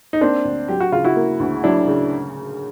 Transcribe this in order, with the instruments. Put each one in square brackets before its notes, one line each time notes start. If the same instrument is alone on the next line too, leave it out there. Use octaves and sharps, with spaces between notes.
[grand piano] D#4
[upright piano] A#3 [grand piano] C4 D4
[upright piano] D2
[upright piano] F#3 [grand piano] G4
[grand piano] F#4
[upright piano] C#3 [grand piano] F4
[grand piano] E4 F#4
[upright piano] A#3
D2
[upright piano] F#3 [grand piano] D4 E4
[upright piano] C#3